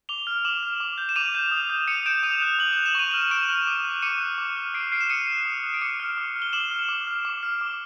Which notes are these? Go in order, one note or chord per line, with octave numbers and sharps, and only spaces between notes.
D6 F7 G7
F6
D6 E7 F#7
F6
D6
G6
E7
D6 D#7 F7
G6
D#6
G6
D#6 C#7 D#7
G6 D7 E7
D#6 D#7 F7
F#6
D#6 F#7
F#6 F7
E7
C#6 D#7 F7
F6 F#7
F7
C#6 D7 E7
F6
D6
F#6
D6 C#7 D#7
F#6
D6
F6
D6 C7 D7
F6 C7 D7
E7
D#6 C#7 D#7
F#6
D#6
F#6
D7
D6 C#7 D#7
F6
D6
F6
G7
D6 E7 F#7
F6
D6
F6
D6
F6
D6